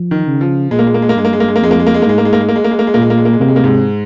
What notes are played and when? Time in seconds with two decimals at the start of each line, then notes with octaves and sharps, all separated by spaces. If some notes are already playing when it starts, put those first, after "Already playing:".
Already playing: F3
0.11 D#3
0.26 C#3
0.41 F3
0.71 A#2 G#3
0.79 A#3
0.87 G#3
0.94 A#3
1.02 G#3
1.09 A#3
1.16 G2 G#3
1.25 A#3
1.33 G#3
1.40 A#3
1.48 G#3
1.56 A#3
1.61 F2 G#3
1.71 A#3
1.79 G#3
1.87 A#3
1.94 G#3
2.02 A#3
2.06 G#2 G#3
2.18 A#3
2.25 G#3
2.33 A#3
2.41 G#3
2.49 A#3
2.56 G#3
2.64 A#3
2.71 G#3
2.79 A#3
2.87 G#3
2.94 A#2 A#3
3.02 G#3
3.10 A#3
3.17 G#3
3.25 A#3
3.33 G#3
3.39 C3 A#3
3.48 G#3
3.56 A#3
3.64 G#2 G#3